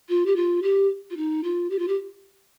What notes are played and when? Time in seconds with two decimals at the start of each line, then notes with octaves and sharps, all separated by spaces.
0.09 F4
0.26 G4
0.36 F4
0.62 G4
1.10 F4
1.16 D#4
1.43 F4
1.70 G4
1.78 F4
1.88 G4